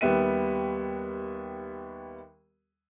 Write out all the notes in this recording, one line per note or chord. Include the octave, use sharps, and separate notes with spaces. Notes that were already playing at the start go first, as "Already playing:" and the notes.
D#2 G3 B3 E5 D#7